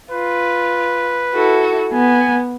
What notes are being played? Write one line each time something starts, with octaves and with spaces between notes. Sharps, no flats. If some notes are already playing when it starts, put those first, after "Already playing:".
F4 B4
E4 F#4 A4
B3 G#5